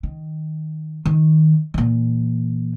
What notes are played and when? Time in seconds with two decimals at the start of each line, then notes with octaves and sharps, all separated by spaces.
0.03 D#3
1.05 D#3
1.74 A#2 E3